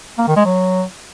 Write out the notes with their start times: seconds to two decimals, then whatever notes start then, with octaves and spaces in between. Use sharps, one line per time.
0.18 A#3
0.27 D#3
0.36 G#3
0.45 F#3